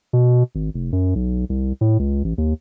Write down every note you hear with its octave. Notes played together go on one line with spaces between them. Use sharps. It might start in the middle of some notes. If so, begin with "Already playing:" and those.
B2
G#1
F1
F#2
B1
C2
A2
C#2
A1
D#2